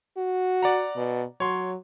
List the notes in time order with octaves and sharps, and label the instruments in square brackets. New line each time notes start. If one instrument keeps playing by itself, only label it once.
[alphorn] F#4
[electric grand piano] D5 F#5 A#5
[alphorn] B2
[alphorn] F#3 [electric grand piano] C#5 C6